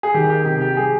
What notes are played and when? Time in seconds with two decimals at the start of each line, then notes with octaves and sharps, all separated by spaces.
0.03 G#4
0.14 D#3 G4
0.30 G4
0.45 C3 G4
0.61 G4
0.77 G3 G#4